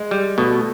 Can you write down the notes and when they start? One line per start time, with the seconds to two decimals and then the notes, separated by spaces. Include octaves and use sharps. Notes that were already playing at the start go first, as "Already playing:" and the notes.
Already playing: G#3
0.11 G3
0.38 B2 A3